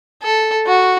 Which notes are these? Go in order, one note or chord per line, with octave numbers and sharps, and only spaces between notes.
A4
F#4